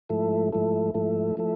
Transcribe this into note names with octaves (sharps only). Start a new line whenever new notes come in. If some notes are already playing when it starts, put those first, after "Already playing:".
G#2 F3 A3 E4 A4
G#2 F3 A3 E4 A4
G#2 F3 A3 E4 A4
F3 A3 E4 A4